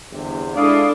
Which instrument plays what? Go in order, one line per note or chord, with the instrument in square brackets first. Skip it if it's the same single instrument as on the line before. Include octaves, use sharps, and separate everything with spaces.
[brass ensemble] G1 E2 C3
[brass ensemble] G#3 E4 [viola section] D4 A4 [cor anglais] D5 [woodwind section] F5 D#6